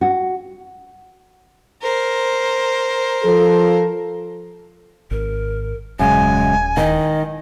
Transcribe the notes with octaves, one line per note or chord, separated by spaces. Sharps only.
F#4
A#4 C5
F3 A4
G#1 A#4
D#1 F#2 C#3 G#3 G#5
D#3 D#5